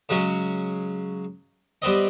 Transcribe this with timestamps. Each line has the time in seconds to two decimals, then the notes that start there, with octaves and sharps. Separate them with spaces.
0.09 C#3 F#3 G#3 C#4
1.82 G3 B3 C4 D#5